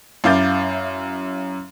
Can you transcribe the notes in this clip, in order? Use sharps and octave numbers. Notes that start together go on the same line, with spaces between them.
F#2 E4 F5 D6 G6 A6